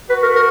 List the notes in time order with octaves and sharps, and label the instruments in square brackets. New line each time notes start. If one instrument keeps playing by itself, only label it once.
[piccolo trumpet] F#4 [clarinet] B4
[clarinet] A#4
A#4